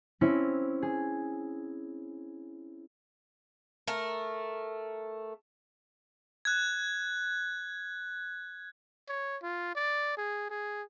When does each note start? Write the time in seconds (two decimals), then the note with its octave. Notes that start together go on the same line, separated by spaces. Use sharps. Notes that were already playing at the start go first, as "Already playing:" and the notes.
0.21 C4 C#4 E4
0.82 G#4
3.87 A3 A#4
6.45 F#6 G#6
9.09 C#5
9.43 F4
9.76 D5
10.17 G#4
10.50 G#4